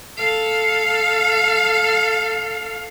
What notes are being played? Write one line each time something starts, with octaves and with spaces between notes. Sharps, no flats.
A4 F5